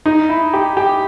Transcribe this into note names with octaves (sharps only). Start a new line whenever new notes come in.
D#4
E4
G4
G4